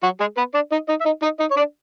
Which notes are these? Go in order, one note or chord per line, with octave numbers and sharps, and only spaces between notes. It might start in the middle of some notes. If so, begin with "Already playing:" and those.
F#3 F#4
G#3 G#4
B3 B4
D4 D5
D#4 D#5
D#4 D#5
E5
D#4 D#5
D#4 D#5
D#4 D#5
C#5
D4 D5